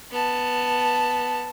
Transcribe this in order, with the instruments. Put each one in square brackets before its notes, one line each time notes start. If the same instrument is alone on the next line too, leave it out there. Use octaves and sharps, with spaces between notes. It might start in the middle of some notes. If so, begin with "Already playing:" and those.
[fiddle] B3 A5